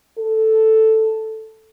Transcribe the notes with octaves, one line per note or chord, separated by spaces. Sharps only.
A4